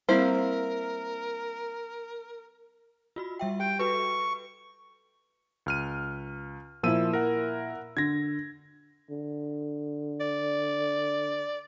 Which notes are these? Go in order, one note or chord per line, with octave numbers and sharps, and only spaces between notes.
G3 A#3 C4 E4 A#4 C5
F4 F#4 B5
G3 E5 G5
G4 G5
F#4 A4 B4 C#6
C#2 F6 D#7
A#2 F3 E4 E6 D#7
A#4 F#5
D3 G#6 A#6
D3
D5